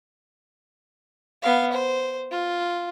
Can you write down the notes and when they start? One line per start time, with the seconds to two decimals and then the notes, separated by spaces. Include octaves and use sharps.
1.42 B3 F5
1.72 C5
2.31 F4